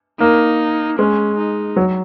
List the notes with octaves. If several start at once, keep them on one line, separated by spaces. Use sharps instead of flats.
A#3 D#4
G#3 C#4
D#4
F#3